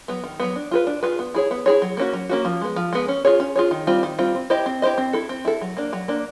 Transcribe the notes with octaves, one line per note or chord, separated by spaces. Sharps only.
F#3 B3
D#3
F#3 B3
D4
F4 G#4 B4
D4
F4 G#4 B4
B3
E4 G#4 C#5
B3
E4 G#4 C#5
F#3
A#3 C#4 F#4
F#3
A#3 C#4 F#4
F3
G#3 B3
F3
G#3 B3
C#4
F4 G#4 C#5
C#4
F4 G#4 C#5
D#3
G3 C4 F4
D#3
G3 C4 F4
C4
E4 G4 C5 D#5
C4
E4 G4 C5 D#5
C4
E4 A4
C4
E4 A4
F#3
A#3 D4
F#3
A#3 D4